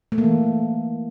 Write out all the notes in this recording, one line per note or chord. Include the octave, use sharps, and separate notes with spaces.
A3
A#3
E3